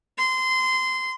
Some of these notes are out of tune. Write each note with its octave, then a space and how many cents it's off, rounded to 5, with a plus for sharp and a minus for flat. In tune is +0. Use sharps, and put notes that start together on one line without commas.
C6 -20